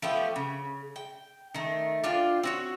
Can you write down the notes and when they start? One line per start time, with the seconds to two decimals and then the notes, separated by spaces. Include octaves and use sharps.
0.02 F3 A3 B3 G4
0.36 C#3
0.96 G5
1.55 D#3 A3
2.04 D4 F4 F5 G5
2.43 C4 F#4 C#5